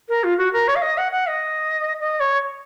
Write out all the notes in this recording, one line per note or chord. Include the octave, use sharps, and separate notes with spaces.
A#4
F4
F#4
A#4
C#5
F5
D#5
F#5
F#5
D#5
D#5
C#5